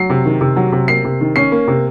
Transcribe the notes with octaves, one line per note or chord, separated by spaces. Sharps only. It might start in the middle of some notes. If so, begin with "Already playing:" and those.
Already playing: F#3 C7
C3
D#3
C3
F#3
C3
A#3 C7
C3
D#3
C#4 C7
A#3
C3